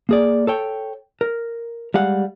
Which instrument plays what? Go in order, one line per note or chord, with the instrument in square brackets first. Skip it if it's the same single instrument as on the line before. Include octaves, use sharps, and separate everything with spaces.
[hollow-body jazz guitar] A#3 G#4 D5
A4 C#5 G5
A#4
G3 G#3 F5 F#5